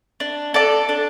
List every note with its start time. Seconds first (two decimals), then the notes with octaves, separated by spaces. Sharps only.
0.20 D4
0.54 A4 D5 A5
0.89 D4